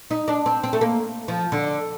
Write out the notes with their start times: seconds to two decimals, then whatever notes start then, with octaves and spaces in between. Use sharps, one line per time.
0.11 D#4
0.28 D4
0.46 C4
0.64 C4
0.73 A3
0.81 A#3
1.28 F3
1.52 D3